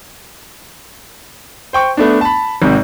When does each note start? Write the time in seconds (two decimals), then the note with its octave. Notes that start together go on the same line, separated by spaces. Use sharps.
1.73 C5 G5 C#6
1.97 A3 B3 D4
2.21 A5 B5
2.62 G#1 G#2 C3